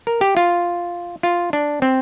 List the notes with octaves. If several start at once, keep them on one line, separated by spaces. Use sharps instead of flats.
A#4
G4
F4
F4
D4
C4